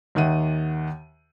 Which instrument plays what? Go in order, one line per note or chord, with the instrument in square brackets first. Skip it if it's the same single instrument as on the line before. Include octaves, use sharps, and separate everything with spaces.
[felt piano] D#2 D#3 E5 F#5 D#7